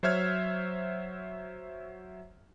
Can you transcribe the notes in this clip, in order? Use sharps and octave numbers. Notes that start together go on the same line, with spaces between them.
F#3 C5 C#5 E5 F6 G#6